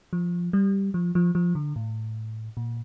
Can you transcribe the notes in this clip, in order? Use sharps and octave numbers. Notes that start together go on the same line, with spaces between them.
F3
G3
F3
F3
F3
D3
A2
A#2